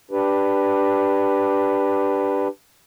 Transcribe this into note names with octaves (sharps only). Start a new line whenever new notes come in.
D4 G4 B4